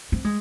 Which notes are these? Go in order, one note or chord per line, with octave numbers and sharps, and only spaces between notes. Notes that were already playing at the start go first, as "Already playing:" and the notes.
C4
G#3